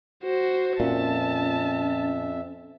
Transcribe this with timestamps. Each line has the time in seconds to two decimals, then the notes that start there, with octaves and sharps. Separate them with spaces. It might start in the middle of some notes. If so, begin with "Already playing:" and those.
0.24 F#4 C5
0.80 F2 A#2 C#4 E5 A5